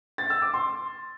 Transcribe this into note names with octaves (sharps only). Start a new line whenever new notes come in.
A6
E6
D6
C6